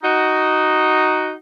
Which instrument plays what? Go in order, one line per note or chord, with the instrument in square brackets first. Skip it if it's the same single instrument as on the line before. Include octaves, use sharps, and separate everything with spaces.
[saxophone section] D#4 F#4